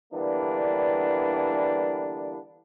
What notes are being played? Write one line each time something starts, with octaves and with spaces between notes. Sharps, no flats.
D3 E3 G3 A#3 B3 D4